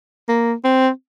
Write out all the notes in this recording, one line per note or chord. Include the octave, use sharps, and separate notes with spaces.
A#3
C4